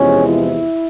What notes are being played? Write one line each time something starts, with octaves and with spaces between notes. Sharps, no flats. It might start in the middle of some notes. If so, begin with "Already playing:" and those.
Already playing: E2 C3 F3 G#3 C#4
E4